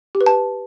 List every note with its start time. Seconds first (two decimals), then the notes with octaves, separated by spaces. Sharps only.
0.15 G4
0.21 B4
0.26 A5